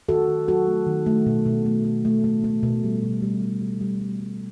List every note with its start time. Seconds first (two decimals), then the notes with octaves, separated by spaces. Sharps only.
0.09 D#3 F#4 A4
0.29 D#3
0.48 F#3 F#4 A4
0.67 A3
0.87 D#3
1.06 A3
1.26 B2
1.46 B2
1.66 A3
1.85 A3
2.05 A3
2.24 A3
2.44 A3
2.63 B2
2.84 G3
3.03 B2
3.22 G3
3.42 G3
3.62 G3
3.81 G3
4.01 G3
4.21 G3